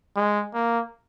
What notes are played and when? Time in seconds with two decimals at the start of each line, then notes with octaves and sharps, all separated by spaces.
0.16 G#3
0.54 A#3